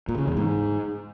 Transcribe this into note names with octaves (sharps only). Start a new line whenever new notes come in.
A#2
C#3
E2
G#2